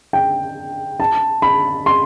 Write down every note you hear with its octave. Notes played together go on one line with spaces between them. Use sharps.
G5
A5
B5
C6